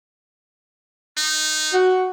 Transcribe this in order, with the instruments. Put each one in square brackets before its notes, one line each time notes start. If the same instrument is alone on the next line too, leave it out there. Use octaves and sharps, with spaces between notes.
[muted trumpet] D#4
[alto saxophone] F#4